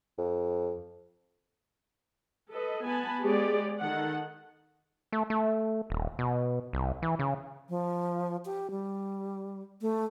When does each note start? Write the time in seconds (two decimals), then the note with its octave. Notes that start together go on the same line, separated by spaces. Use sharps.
0.18 F2
2.51 A4 B4 D#5
2.85 B3 G#5 A5 B5
3.21 G#3 B3 G4 G#4 C#5 D5
3.80 D#3 A4 F#5
5.13 A3
5.30 A3
5.90 D#1
6.19 B2
6.73 C2
7.02 E3
7.19 C#3
7.69 F3
8.45 G4
8.71 G3
9.81 A3